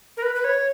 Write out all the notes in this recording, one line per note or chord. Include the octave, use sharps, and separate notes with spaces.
A#4
B4
B4
C#5